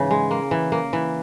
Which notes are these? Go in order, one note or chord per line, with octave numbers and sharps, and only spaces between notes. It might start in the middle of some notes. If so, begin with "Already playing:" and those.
Already playing: G#2 C#3 E3
G#3
A#3
E3
A#3
E3